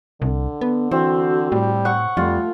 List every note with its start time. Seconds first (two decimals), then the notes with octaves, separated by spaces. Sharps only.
0.22 C2 D3
0.61 B3
0.91 E3 C4 F#4
1.52 A2 G3
1.85 F#5 C#6
2.17 F2 G3 A3 F4